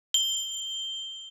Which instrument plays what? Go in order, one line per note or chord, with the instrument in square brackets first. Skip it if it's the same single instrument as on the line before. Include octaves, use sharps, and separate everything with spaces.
[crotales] G7